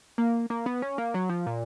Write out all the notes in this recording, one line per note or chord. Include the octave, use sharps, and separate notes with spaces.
A#3
A#3
B3
C#4
A#3
F#3
F3
A#2